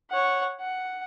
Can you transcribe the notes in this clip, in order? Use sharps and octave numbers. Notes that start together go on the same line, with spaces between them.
C#5 F#5
F#5